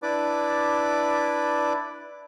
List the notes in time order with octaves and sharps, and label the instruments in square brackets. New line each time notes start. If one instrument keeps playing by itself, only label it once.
[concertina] D4 E4 B4 D5 B5 D6